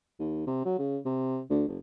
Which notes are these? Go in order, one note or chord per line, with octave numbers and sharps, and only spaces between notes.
D#2
C3
F#3
C#3
C3
D2
F#1